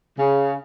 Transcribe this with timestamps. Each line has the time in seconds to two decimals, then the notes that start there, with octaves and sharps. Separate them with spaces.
0.19 C#3